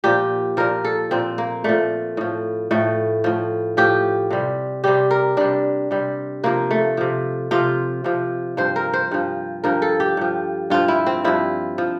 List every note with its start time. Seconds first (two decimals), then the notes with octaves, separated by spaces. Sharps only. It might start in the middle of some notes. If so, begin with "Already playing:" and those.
0.04 A#2 F3 G4
0.57 A#2 F3 A#4
0.85 A4
1.11 A#2 F3 C4
1.38 A#3
1.64 A#2 F3 A3
2.17 A2 F3
2.71 A2 F3 A3
3.24 A2 F3
3.77 A2 F3 G4
4.30 C3 G3
4.84 C3 G3 G4
5.11 A#4
5.37 C3 G3 D4
5.91 C3 G3
6.44 C3 F3 A#3
6.71 A3
6.97 C3 F3
7.51 C3 F3 F4
8.04 C3 F3
8.57 G2 F3 C5
8.76 A#4
8.93 C5
9.11 G2 F3
9.64 G2 F3 A#4
9.82 A4
10.00 G4
10.17 G2 F3
10.70 G2 F3 F4
10.88 E4
11.07 C4
11.24 G2 F3 E4
11.78 F3